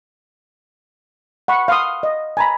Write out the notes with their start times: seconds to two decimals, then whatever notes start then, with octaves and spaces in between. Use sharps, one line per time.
1.48 F#5 B5 C#6
1.68 F5 C6 D#6
2.03 D#5
2.37 G#5 A#5 B5